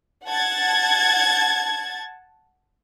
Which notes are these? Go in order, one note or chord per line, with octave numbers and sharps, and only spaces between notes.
F#5 A5 G#6 A6